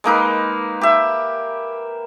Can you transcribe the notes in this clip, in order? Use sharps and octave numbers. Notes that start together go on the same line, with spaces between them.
G#3 A#3 D#4 B4
G4 E5